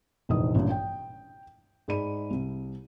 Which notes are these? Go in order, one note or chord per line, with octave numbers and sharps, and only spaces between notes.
F1 A#1 E3 D#4 B4 D#6
A1 G2 A#2
G5
G#2 G#3 D5 B5 D#7
C2